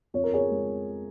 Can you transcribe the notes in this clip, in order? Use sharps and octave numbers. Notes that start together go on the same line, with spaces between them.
F2 C#5
A#4
G#4 C#5
G#3